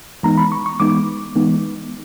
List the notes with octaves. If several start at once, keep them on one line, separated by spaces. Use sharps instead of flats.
E3 G#3 B3 D#4 A#5
B5
C#6
C#6
E3 G#3 B3 D#4 D6
E3 G#3 B3 D#4